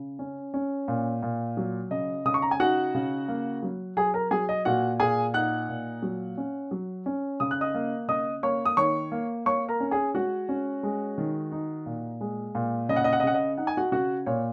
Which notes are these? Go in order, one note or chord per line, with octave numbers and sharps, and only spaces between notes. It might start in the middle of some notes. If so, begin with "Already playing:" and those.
Already playing: C#3
C#4
C#4
A#2
A#2
F#3
C#3 D#5
C#3 D#6
C#6
A#5
G#5
D#4 F#4 F#5
C#3
A#3
F#3
F#3 G#4 G#5
A#4 A#5
F#3 G#4 G#5
D#5
A#2 F#4 F#5
A#2 G#4 G#5
D#4 F#5 F#6
A#2
F#3
C#4
F#3
C#4
C#3 D#6
F#6
D#5 D#6
A#3
C#3 D#5 D#6
A#3 C#5 C#6
D#6
D#3 C#5 C#6
A#3
A#3 C#5 C#6
A#4 A#5
C#4
G#4 G#5
G#3 F#4 F#5
C#4
G#3
D#3
D#4
A#2
G#3
A#2
C#3 D#5
F#5
D#5
F#5
D#5
C#3 F#5
D#5
D#4 F#5
G#5
F#4 F#5
C#3 F#4 F#5
A#2 C#5